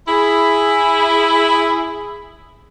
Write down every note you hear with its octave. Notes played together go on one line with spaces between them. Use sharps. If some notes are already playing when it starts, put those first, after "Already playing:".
E4 G#4